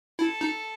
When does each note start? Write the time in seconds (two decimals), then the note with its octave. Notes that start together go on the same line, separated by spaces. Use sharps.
0.19 E4 A4
0.41 D#4